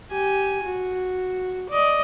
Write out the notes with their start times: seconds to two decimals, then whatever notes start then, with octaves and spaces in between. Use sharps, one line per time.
0.11 G4 G#5
0.64 F#4
1.70 D5 D#5